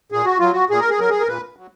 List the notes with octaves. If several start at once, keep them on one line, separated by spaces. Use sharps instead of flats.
A#2 G#4
F#4
F#3 F4
F#4
A#2 G#4
A#4
G#4
F#3 A#4
G#4
A#4
A#2 B4
F#3